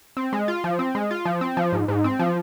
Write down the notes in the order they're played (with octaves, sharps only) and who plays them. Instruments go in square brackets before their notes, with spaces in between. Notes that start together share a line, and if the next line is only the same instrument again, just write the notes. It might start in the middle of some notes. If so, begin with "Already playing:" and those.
[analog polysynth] C4
G#3
F4
F3
C4
G#3
F4
F3
C4
F3
G#2
G#2
C4
F3